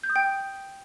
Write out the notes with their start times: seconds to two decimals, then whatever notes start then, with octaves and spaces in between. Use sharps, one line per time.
0.03 G6
0.10 D#6
0.16 G5